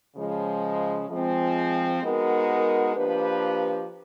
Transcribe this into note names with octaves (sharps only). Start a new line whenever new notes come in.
C#3 F3 G#3
F3 G#3 C4
G#3 B3 D#4 F#4 A#4
F3 A#3 D4 G4 B4